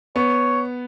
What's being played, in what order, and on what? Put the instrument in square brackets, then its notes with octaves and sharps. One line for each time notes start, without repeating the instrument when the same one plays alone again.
[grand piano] B3 [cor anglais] C#5